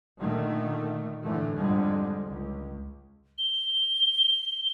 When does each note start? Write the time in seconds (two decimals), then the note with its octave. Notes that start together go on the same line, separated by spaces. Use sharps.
0.20 A#2 D3 D#3 A3
1.25 A2 D3 E3 A3
1.57 F2 G#2 D3 G3 G#3
2.26 C#2
3.38 G7